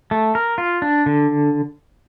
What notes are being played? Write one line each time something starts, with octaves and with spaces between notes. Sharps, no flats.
A3
A#4
F4
D4
D3